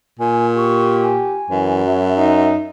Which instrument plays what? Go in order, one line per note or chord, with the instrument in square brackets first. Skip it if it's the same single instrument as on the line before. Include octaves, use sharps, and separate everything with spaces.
[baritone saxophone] A#2 [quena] G#5
[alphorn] G4 [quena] C#6
[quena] G#5
[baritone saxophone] F#2 [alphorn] E3
[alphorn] F#3 [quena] E5
[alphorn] D#4